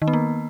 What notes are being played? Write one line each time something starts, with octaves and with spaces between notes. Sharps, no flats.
D#3
B3
A#3